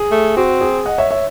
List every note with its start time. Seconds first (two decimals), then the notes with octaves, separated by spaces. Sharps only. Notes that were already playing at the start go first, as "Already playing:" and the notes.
Already playing: G#4
0.11 A3
0.37 C4 F#4
0.61 G#4
0.86 D#5 F#5
0.98 C#5 E5
1.11 C#5 E5